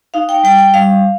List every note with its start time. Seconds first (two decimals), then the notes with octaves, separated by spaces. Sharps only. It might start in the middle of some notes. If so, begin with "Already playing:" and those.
0.14 D#4 F5
0.29 G5
0.44 G3 G5
0.59 G5
0.74 G3 F5